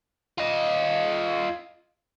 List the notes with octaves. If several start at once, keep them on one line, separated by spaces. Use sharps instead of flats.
F4 D#5